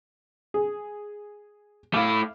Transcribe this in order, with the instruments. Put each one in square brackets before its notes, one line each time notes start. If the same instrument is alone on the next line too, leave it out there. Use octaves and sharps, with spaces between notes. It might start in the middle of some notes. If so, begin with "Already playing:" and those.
[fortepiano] G#4
[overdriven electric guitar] A3 E4 [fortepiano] F5 D6